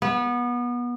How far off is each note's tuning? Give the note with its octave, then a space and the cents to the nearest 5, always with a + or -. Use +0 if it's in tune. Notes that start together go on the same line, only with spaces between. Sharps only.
B3 -25